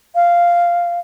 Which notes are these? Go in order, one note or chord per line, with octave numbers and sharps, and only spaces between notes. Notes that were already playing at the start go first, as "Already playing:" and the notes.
F5